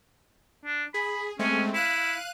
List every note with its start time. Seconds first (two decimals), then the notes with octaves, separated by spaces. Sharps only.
0.65 D4
0.94 G#4 B5
1.39 G#3 A3 C4 C#4
1.74 E4 F5 F#6 D#7